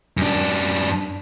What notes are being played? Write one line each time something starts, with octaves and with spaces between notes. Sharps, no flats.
F#2 D4